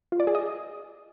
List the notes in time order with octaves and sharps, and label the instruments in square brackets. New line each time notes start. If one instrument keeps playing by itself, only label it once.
[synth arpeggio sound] F4
D5
G#4
D#5